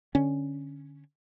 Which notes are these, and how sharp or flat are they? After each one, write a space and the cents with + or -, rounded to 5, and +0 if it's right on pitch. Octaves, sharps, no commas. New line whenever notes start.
D3 +0 C#4 +0